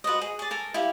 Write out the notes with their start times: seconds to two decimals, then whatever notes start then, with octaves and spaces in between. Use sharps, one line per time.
0.04 F#4 B4 C5 D#5
0.21 G#4
0.39 G#4 D5
0.50 A4 A#4 G#5
0.74 E4 G4 F5